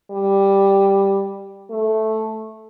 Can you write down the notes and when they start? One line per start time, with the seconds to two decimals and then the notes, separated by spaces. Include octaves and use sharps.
0.11 G3
1.70 A3